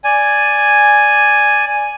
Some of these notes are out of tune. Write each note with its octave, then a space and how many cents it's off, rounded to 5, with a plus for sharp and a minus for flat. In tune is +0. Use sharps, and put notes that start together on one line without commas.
D5 +0 G#5 +0